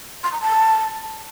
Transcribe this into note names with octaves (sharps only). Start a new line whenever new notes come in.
C6
A#5
A5